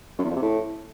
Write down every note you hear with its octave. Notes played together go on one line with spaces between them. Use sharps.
F#2
E2
F2
C3
A2